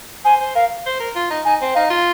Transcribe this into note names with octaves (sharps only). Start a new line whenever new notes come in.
C5 G#5
C5
A#4 F5
C5
A#4
F4
D#4
D#4 G#5
C4
D#4 F5
F4